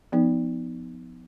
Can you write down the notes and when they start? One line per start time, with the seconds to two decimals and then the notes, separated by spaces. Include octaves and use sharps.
0.12 F3 B3 D#4